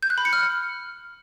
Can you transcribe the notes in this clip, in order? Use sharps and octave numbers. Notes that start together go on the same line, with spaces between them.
G6
F#6
B5
C#7
F6